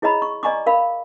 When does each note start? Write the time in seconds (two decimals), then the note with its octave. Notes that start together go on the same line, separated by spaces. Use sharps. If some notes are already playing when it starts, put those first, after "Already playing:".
0.02 E4 G#4 C#5 D#5 A#5 B5
0.22 C#6
0.43 D5 D#5 G#5 A#5 C#6 D6
0.66 A#4 F5 B5